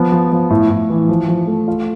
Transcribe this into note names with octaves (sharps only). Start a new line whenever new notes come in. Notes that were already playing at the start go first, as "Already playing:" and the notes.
Already playing: F3 B3
F3
F3
A2
A2
E3
F3
F3
A3
F4